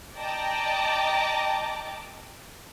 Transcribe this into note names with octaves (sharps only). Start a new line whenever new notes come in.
D5 D#5 G5 A5 A#5 D6